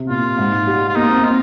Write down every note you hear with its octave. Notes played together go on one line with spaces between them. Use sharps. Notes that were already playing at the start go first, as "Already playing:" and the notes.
Already playing: C3
A#2 F4
G#2
G3
F4
A#3 D#4
C4
C4 F4